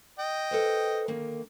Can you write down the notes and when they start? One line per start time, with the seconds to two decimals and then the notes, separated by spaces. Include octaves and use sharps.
0.19 D#5 G5
0.51 A4 B4 C5
1.08 D3 D#3 A#3